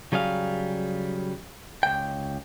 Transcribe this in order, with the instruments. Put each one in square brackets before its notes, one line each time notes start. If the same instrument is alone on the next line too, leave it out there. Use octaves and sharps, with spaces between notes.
[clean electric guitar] C#3 F#3 G3 G#4 F5
C#2 G5